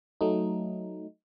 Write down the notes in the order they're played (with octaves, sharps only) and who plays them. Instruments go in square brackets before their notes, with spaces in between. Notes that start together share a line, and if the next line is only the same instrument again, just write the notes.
[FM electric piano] F#3 A3 D#4